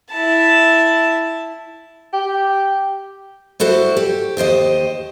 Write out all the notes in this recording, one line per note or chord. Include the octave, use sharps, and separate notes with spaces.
E4 A5
G4
G3 E4 F#4 A4 C5
G4
D#2 G4 C5 D#5